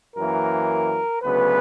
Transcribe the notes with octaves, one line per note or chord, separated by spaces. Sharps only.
F#2 E3 A#3 A#4
D2 C#3 F#3 B3 B4